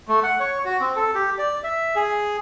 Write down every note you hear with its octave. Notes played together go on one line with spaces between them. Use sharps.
A3
F#5
C#5
F#4
C4
A4
G4
D5
E5
G#4